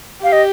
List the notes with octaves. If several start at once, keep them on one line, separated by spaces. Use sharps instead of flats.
G4 F5
D#5